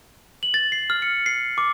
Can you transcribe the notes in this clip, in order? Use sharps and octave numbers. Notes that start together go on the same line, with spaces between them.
F#7
A6
C7
F6
C#7
C7
D6